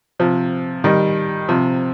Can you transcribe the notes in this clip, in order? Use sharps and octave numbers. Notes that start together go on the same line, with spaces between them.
C3 F3
D#3 G3
C3 F3